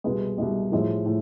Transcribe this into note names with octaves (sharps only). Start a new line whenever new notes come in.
C2 B2 G#3 B4
C2 B2 G#3
A2 F3 G#3
A2